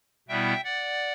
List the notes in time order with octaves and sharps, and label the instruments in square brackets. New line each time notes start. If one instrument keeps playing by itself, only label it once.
[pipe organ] B2 G3 B3 E4 E5 G5
D5 F#5